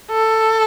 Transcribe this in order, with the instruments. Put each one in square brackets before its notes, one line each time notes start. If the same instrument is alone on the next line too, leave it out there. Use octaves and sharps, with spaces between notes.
[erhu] A4